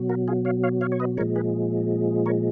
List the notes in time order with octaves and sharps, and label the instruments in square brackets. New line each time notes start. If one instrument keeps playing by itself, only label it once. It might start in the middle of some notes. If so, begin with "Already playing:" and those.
Already playing: [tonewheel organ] B2 F#3
F#4 A#4
F4 G#4
C#5 F5
C#5 F5
C#5 F5
C#5
B4 D#5
A#2 F3 G#3 A#4 C#5
G#4 B4
A#4 C#5